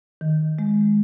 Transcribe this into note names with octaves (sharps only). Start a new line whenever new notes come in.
D#3
G#3